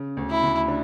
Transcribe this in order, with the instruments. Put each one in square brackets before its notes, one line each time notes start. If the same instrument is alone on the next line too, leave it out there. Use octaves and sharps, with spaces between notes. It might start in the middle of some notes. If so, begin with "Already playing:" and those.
Already playing: [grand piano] C#3
D2
[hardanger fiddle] E4
[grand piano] D2
D4